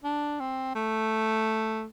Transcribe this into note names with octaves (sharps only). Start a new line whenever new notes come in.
D4
C4
A3